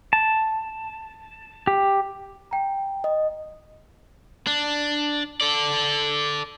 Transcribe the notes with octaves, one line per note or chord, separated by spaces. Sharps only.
A5
G4
G5 A#5
D#5
D4
A4 D5